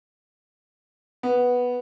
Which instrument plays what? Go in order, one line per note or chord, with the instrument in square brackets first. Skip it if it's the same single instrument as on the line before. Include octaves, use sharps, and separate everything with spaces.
[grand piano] B3